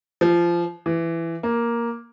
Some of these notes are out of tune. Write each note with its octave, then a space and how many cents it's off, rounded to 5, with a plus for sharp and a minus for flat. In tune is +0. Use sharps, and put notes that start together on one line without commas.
F3 -20
E3 +15
A#3 +5